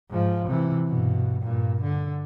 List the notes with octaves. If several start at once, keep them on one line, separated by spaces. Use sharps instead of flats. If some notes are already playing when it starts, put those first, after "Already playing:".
G#2 F3
C3 E3
G2 B2
G2 A#2
D3